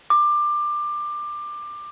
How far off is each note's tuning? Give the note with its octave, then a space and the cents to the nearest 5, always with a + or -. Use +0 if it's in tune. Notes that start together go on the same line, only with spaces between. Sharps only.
D6 +20